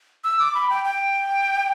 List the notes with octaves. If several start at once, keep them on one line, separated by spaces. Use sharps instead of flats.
E6
D6
B5
G5
G5